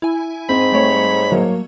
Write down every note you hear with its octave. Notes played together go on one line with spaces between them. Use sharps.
E4 G#5
G#2 C4 B5
G3 A3 C#5
F#3 A#3